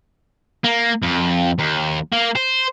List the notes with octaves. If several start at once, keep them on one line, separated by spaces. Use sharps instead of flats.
A#3
F2
D#2
A#3
C5